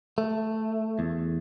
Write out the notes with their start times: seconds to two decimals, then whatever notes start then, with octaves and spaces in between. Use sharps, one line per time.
0.18 A3
0.99 E2